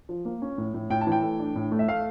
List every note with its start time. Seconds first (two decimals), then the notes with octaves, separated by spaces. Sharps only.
0.09 F3
0.25 A#3
0.42 C#4
0.58 A2
0.74 A2
0.90 A2 G5
1.01 A5
1.07 E3
1.12 G5
1.23 A3
1.39 D4
1.55 A2
1.72 A3
1.79 E5
1.88 A3 F5